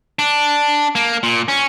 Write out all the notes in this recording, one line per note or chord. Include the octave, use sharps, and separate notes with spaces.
D4
A#3
A#2
C#4